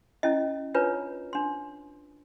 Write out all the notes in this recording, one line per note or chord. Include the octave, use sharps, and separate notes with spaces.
C#4 E4 D#5
D4 F4 A#4 B4 C#5 A#5
D4 C6